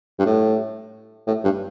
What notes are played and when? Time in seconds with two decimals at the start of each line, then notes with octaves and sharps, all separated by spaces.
0.19 G2
0.26 A2
1.27 A2
1.44 G2